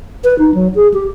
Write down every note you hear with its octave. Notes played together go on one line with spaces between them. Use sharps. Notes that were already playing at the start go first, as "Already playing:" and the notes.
B4
D#4
F#3
G#4
G4